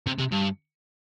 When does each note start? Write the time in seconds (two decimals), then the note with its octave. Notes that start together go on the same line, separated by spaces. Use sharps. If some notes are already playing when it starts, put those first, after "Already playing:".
0.06 C3
0.18 C3
0.32 G2